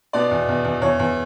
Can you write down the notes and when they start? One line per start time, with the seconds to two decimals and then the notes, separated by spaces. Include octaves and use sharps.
0.13 B2 D5
0.31 E2
0.49 E2
0.65 E2
0.82 E2 C#5
0.99 E2